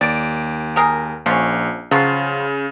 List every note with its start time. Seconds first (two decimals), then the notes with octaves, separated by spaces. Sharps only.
0.01 D#2 D5 D7
0.76 G4 G#4 A#4
1.26 A#1 F3 C#4
1.91 C#3 F3 F#3 F4